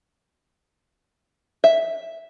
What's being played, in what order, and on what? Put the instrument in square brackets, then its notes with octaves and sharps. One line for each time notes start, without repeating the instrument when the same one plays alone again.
[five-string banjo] E5